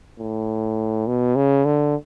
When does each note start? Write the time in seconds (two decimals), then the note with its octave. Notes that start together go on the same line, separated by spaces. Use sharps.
0.20 A2
1.07 B2
1.36 C#3
1.65 D3